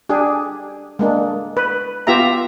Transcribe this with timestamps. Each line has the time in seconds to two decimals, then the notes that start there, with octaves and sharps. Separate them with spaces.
0.09 D4 G4 G#4
0.99 G#3 A#3 D4
1.57 B4
2.07 B3 F4 G4 E5 A#5